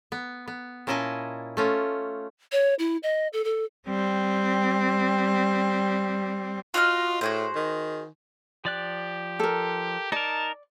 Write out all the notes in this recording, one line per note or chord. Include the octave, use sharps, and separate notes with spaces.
B3
B3
A#2 C#4 E4 D#5 G#5 A5
A3 C#4 F4
C#5
E4
D#5
A4
A4
G3 C4
F4 F#4 D#5 F6
A2 F#4 G#4 C5
D#3
F3 G4 D5 F#6
A4 A#4
D#4 A#4 D5 A5